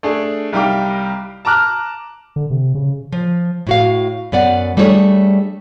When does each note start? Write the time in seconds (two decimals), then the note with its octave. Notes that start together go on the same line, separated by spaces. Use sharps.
0.03 A3 D4 G#4
0.52 C2 G3 D#4 F5 G5 D6
1.45 A5 A#5 D6 F6 F#6
2.36 D3
2.50 C3
2.75 C#3
3.12 F3
3.67 A2 F#4 F5
4.32 F#2 B3 D5 F#5
4.77 G3 A3 D4 E4 G#4 C#5